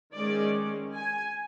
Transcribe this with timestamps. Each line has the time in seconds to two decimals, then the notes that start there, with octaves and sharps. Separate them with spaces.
0.15 D#3 G#3 C#4 D5
0.95 G#5